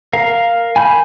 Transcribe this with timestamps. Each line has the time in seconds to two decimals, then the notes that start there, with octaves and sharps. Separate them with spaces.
0.13 A#4 F5
0.76 G#5 B5 G6